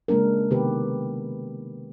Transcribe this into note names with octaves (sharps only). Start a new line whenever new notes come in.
C#3 G#3 A#3 D4 A#4
C3 D#3 B3 G4 B4